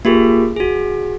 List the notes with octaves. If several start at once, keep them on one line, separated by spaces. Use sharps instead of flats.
A#3 F4 G4 G#4 A#4
F#4 G#4